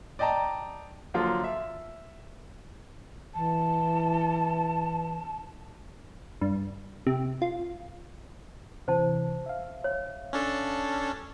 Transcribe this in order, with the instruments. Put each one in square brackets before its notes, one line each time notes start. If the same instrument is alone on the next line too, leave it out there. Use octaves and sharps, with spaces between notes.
[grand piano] D5 D#5 G5 A5 A#5
D3 F3 F#3 A#3 F4
E5
[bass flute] E3 [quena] A5
[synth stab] G2
C3
F4
[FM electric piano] C3 E3 [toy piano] C5 A5
[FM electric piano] E5 F5
[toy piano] C#5
[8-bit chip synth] C#4 D4 A4